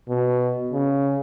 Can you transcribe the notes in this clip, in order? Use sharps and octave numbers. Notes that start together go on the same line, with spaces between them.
B2
C#3